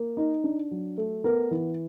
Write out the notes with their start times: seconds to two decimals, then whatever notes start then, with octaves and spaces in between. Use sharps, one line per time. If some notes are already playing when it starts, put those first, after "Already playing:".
Already playing: A#3
0.17 D#4
0.44 D4
0.71 F#3
0.98 A3
1.24 B3 A#4
1.51 E3